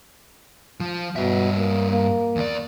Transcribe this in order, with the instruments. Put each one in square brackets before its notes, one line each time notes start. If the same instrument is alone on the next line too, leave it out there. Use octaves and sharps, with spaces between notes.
[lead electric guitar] F3
[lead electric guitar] G2 E5 [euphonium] B2
[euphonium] A#3
A#3
[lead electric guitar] E2 D5